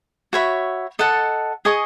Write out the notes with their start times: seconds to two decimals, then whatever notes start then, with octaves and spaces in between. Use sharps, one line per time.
0.33 F#4 C#5 E5 B5
0.99 A4 D#5 F#5 A5
1.65 G#4 D#5 G#5 C#6